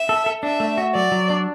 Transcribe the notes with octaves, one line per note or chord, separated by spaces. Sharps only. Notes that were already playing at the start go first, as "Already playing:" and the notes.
Already playing: E5
A4
A4
D4 E5
A3
F#4
F#3 D5
F#3
D4